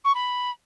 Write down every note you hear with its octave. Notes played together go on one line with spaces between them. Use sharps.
C#6
B5